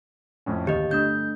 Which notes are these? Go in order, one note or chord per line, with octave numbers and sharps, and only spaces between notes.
F2 A2 C#4
D1 D#2 G4 D#5 G6
G1 A3 D4 G6